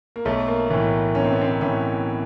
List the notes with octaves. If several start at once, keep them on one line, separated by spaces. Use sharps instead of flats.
A#3
B1 A3
A#3
A2 E3 A#3
B1 C#4
C4
B3
C4
A2 E3 C#4